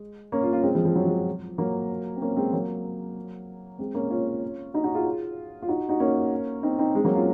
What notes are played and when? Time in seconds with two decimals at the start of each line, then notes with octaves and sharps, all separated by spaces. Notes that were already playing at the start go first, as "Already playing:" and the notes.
Already playing: G#3
0.32 A#3 C#4
0.42 C#4 F4
0.53 C#4 F4
0.63 G#3 C4
0.75 F3 G#3
0.85 F3
0.96 F#3
1.05 F3 G#3
1.58 F#3 A#3
2.17 C4
2.21 A#3 C#4
2.37 G#3 C4
2.53 F#3 A#3
3.79 G#3 C4
3.94 A#3 C#4
4.10 C#4 F4
4.74 D#4 F#4
4.84 D#4 F#4
4.94 F4 G#4
5.62 F4
5.68 D#4 F#4
5.89 D#4 F#4
6.00 A#3 C#4
6.63 C4 D#4
6.79 C4 D#4
6.95 G#3 C4
7.05 F#3 A#3
7.15 C#4 F4